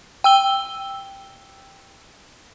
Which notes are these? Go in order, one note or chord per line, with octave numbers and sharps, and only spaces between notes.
G5 E6 G7